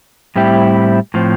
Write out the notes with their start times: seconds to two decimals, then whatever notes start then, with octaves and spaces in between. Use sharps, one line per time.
0.36 A2 G3 C4 E4 G4
1.14 A2 F3 C4